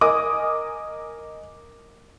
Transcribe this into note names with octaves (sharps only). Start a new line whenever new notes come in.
A#4 D#5 G#5 D6 D#6